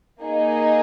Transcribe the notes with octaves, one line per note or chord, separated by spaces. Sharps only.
A#3 D#4 G#4 D#5